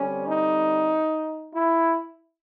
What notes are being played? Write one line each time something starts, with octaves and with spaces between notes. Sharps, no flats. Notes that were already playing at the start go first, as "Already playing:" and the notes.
Already playing: D3 G3 C4 C#4
D#4
E4